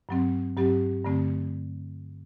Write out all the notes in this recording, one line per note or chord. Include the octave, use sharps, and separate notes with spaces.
G2 F#3 C4
G2 F#3 C4 G4
G2 D3 A3 C4